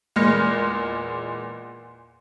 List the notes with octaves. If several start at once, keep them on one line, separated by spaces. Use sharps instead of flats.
E2 A#2 G#3 F6 A#6 C#7